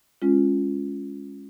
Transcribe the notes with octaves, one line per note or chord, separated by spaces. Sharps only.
G#3 C#4 F4